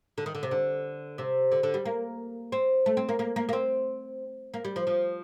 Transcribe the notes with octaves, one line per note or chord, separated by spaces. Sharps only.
D3
D#3
D3
C3
D3
C3
D3
D3
G3
A#3
C4
A3
C4
A#3
A#3
A#3
A#3
C4
A#3
G3
F3
F3